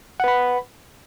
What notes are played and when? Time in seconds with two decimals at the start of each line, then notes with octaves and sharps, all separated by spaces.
0.20 F#5
0.24 B4
0.28 B5